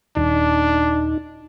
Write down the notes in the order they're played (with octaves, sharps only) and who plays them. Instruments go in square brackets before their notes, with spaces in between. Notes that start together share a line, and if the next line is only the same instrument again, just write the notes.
[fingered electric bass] D#1 [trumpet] D4 [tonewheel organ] D#4